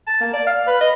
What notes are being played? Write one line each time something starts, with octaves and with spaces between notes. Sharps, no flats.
A5
A#3
D5
F5
B4
D#5